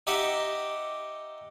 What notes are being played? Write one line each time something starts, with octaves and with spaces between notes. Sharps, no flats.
D#4 G4 D#5 E5 F#5 D6